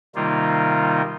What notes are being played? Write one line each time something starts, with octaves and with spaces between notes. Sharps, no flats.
C3 D#3 G3 A#3 D#4 F4